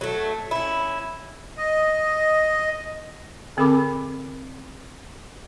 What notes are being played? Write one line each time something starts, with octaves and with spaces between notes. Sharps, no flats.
F#3 A3
C#4 E4
D#5
D3 C4 A4 A#4 B5 D6